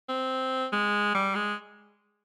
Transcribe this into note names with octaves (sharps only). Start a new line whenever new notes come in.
C4
G#3
G3
G#3